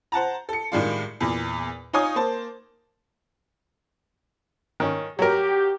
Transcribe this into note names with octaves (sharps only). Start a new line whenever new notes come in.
C5 F#5 A5 A#5
A4 C#7
A2 D#3 G3 G#3 D4 F4
E2 A#2
D#4 F4 C#5 G#5 D#6
A#3 C5 A5
D#3 C#4
F#3 G4 A#4